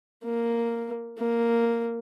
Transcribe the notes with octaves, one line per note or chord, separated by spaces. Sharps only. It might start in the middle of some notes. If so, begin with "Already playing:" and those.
A#3
A#3